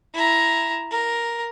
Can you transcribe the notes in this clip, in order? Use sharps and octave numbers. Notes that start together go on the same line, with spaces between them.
E4 A#5
A#4